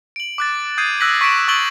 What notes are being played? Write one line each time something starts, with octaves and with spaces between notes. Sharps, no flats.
D7 F#7
D6 F#6 A6
D#6 G6 G#6 C7 D#7
E6 F#6 A#6 B6 F#7
C#6 B6 C7 D7 E7
C#6 E6 A6 D7 F#7 G7